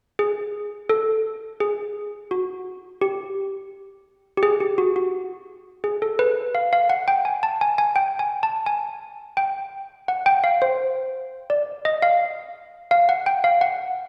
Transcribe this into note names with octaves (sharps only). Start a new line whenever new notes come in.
G#4
A4
G#4
F#4
G4
G4
G#4
G4
F#4
F#4
G#4
A4
B4
F5
F5
F#5
G5
G#5
A5
G#5
G#5
G5
G#5
A5
G#5
G5
F#5
G5
F5
C5
D5
D#5
F5
F5
F#5
G5
F5
F#5